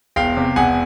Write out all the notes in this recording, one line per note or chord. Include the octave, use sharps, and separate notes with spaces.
E1 F5 G5
C3
E1 F#5 G#5